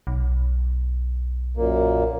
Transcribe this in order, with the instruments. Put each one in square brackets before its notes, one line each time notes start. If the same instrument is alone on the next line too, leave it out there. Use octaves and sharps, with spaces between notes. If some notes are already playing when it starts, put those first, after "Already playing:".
[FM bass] B1
[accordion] F#2 A#2 A#3